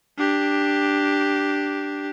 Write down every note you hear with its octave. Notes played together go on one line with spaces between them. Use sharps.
D4 G4